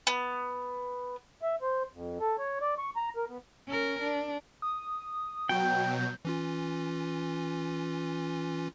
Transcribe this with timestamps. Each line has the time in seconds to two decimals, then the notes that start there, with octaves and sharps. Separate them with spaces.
0.07 B3
1.42 E5
1.62 C5
1.93 F2
2.20 A4
2.38 C#5
2.61 D5
2.78 C#6
2.96 A#5
3.16 A#4
3.29 B3
3.67 C#4 A#4
4.02 D4
4.62 D#6
5.49 B2 F#3 G5 G6
6.25 E3 C#4 F4